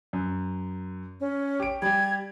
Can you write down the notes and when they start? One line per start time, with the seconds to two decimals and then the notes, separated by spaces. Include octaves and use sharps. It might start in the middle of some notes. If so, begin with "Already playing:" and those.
0.13 F#2
1.20 C#4
1.60 G4 D7
1.82 G3 G4 G#6